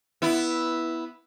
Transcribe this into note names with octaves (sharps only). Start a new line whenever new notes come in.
B3 E4